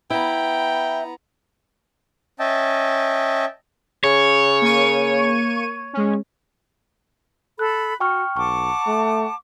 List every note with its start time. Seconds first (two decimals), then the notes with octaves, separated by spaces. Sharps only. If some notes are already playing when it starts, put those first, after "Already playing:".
0.10 B3 E4 G5 A#5
2.40 C#4 D#5 E5 G5 A5
4.04 C#3 C#5
4.62 A#3 C#6 D#7
5.93 G#3 C#4
7.59 A4 B5 F#6
8.00 F#4 G5 C#6 F6
8.37 B1 F#5 A5 C#6 D6
8.87 A3